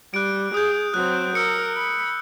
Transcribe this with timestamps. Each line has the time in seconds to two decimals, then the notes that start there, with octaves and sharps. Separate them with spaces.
0.14 G3 F#6 D7
0.54 G#4 D#6 G6
0.94 F#3 C4 F#6
1.35 A#4 E6 C#7
1.76 B5